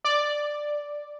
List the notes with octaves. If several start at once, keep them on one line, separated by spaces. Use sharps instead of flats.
D5